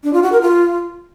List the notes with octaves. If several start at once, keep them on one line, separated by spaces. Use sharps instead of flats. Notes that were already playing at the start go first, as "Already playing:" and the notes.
D4
F4
F#4
A#4
F4